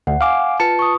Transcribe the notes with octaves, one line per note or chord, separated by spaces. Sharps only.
D2 F#5
F5 F#5 G#5 D6
F4 B4 A5 C#7
C#6 D#6